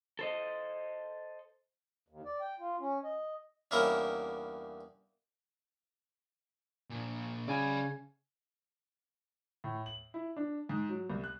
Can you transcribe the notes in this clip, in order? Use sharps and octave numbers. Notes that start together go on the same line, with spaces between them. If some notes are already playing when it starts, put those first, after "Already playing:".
A4 C5 D#5
D#2
D5
G5
F4
C#4
D#5
E2 G2 A#3 C#4 E4 A#4
A#2 F3
C#3 D5 G#5 B5 G#6
A2
F#7
E4
D4
G#2
F#3
C2
F#6